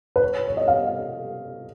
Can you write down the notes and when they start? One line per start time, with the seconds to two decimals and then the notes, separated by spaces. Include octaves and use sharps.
0.16 B4
0.22 C#5
0.48 C#5
0.57 D#5
0.68 F5